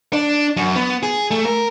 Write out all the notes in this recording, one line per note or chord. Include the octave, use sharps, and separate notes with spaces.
D4
F#2
B3
G#4
A3
A#4